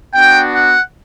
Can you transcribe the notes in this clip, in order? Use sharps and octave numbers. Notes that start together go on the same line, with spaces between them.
B3 D4 F#4 G5
F#5